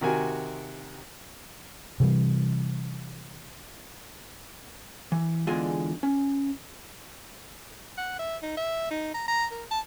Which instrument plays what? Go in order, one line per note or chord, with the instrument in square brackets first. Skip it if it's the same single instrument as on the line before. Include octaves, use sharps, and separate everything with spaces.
[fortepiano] C3 D#3 F#4 A#4 G#5
[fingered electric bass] C3 E3 G3
[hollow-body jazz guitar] E3
E2 D3 G#3 D4 F4 G#5
C#4
[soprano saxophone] F#5
E5
D#4
E5
D#4
A#5
A#5
A#4
A5